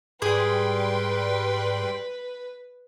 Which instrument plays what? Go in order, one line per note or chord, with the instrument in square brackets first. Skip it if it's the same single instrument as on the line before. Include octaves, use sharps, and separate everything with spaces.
[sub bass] G#2 [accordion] G3 G5 C6 [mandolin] G#4 [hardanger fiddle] B4